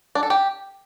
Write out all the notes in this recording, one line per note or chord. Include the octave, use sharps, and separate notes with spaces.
D4
A4
G4